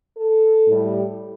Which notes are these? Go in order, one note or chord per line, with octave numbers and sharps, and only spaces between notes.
A4
A2 G3